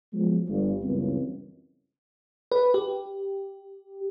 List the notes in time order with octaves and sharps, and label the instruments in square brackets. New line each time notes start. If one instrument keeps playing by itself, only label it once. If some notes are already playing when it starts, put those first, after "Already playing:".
[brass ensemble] F3 F#3 G#3 B3
G1
C#2 F#2 E3 G3 B3 C4
[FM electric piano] B4
G4